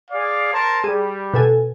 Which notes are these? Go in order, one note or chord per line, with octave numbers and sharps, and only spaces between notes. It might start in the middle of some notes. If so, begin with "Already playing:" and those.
G#4 D5 F5
A#4 C5 A5
G3 G#4
B2 A4 G#5